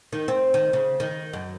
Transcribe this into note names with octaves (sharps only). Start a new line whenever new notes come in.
D#3
C4
D#3
C#3
D#3
F#2